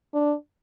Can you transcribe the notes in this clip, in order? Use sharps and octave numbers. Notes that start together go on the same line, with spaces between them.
D4